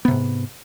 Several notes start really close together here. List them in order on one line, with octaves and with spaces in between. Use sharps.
B3 C3 G#2